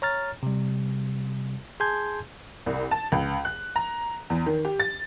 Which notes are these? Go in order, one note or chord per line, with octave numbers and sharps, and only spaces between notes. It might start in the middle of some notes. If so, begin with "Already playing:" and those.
C#5 A#5 F6 A6
C3 G3
G#4 G#5 A5 C6 G6 G#6
C2
A5
C#2
F#6
A#5
E2
D#3
G4
A6